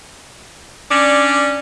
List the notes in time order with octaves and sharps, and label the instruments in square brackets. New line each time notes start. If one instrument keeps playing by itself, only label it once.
[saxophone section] C#4 D4 D5